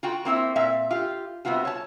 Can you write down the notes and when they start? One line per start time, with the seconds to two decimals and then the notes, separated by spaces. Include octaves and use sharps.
0.03 F4 F#4 G5
0.25 A#3 C4 E4 C5
0.56 A#2 C4 E5 F5
0.91 F4 G4
1.45 C3 G3 B3 F4 F#4
1.65 C#5 A5